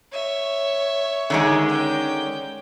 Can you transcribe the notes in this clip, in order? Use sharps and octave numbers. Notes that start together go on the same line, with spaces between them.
C#5 E5
D3 D#3 G#3
C#4 G5